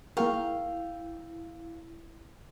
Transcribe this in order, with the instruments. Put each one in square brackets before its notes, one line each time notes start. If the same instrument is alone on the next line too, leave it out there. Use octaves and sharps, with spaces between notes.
[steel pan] A#3 G#4 A#4 [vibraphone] E4 [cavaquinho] F5 G5 C#6